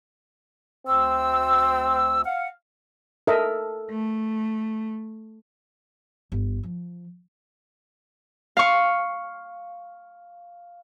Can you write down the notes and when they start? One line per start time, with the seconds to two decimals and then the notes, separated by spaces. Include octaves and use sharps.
0.87 D2 C4 E6
2.25 F5 F#5
3.27 A4 A#4 D#5 E5
3.90 A3
6.32 G1
6.63 F3
8.57 F5 C#6